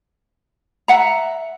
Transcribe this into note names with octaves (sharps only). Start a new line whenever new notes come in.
E5 F#5 A#5